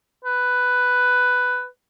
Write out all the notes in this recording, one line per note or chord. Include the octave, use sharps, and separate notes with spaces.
B4